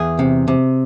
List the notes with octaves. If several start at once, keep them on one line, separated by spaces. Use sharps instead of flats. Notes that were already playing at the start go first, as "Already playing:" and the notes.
Already playing: E2 G#4
C3
C3